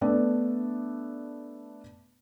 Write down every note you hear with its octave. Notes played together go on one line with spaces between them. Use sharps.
A3 B3 D4 D5